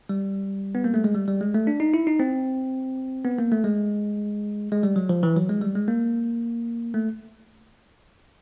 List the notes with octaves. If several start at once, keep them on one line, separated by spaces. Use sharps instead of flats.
G3
B3
A#3
A3
G#3
G3
G3
G#3
A3
D4
D#4
E4
D#4
C4
B3
A#3
A3
G#3
G#3
G3
F#3
F3
E3
F#3
G#3
G3
G#3
A#3
A3